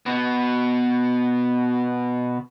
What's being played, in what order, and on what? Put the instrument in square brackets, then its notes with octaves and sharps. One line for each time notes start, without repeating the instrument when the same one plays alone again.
[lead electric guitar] B2 B3